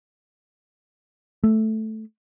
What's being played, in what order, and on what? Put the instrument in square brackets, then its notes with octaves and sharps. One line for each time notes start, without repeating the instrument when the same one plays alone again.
[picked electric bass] A3